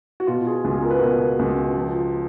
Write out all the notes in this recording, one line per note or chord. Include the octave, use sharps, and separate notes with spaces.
F#4
B2 F4
F4 G#4
C#2 F4 G#4
A#4
B4
B2 F#4 A#4
C#2
F3